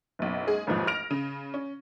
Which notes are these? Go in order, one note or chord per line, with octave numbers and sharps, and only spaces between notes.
F#1 B1
G#3 G#4
A1 D#2 G#2 F3
F6 A#6 D7 F7
C#3
C#4